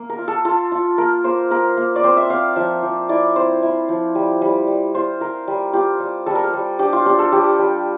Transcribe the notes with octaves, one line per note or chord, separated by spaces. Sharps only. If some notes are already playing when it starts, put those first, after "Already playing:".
Already playing: A#3
A#4
F4
A4
F4 A4
F4
A#3 A#4
A#3 C5
A#3 A#4
A#3
D5
C4 C5
E5
C4 F5
F3 E5
F3
E4 D5
C4 C5
E4
F3
G3
G3
G3
F4 C5
F4 A#4
G3
F4 G4
G3
G3 A4
A#4
A4
G3
D4 G4
F4
D4 G4
A4
G3 G4
G3